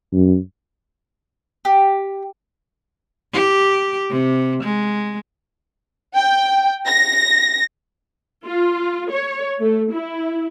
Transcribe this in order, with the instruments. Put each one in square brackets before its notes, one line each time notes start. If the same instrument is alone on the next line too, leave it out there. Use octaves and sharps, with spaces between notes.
[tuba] F#2
[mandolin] G4
[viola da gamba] G4
C3
G#3
[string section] G5
A#6
[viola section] F4
C#5
A3
E4